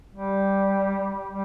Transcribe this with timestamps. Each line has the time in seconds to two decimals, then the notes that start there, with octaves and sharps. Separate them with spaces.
0.11 G3
1.28 G3